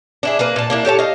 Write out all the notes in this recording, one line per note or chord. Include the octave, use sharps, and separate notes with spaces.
D4 E4 G#4
A#3 A#4 B4
A#2 A5
A#3 D4 E4 A#4
G4 A4 C#5 A5
D#5 F5